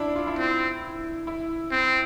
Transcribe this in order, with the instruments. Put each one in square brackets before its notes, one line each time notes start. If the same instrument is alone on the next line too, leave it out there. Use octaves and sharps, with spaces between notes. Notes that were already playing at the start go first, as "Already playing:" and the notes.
Already playing: [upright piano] D4 E4
F4
E4
[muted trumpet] C4
[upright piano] E4
[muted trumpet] C4